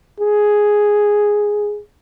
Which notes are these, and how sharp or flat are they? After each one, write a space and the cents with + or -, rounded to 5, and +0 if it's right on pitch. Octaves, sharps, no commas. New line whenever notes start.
G#4 +0